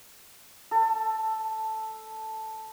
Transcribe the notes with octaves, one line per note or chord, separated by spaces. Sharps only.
A4 A5